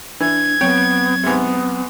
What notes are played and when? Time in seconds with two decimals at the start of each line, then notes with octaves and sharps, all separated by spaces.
0.20 E3 D4 G#6
0.61 F#3 B3 C4 C#5 G5
1.23 G#2 C3 B3